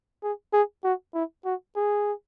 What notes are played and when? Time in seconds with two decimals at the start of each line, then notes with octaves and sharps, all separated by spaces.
0.23 G#4
0.53 G#4
0.84 F#4
1.14 E4
1.45 F#4
1.76 G#4